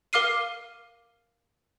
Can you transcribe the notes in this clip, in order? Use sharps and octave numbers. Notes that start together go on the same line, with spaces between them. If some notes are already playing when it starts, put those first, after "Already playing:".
A#4 F5 D6 F6 C7 D#7